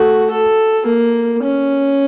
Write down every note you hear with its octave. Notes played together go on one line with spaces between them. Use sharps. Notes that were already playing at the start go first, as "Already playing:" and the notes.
Already playing: A3 F#4
A4
A#3
C#4